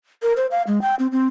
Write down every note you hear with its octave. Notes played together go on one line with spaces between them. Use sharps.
A#4
C5
F5
G#3
G5
C4
C4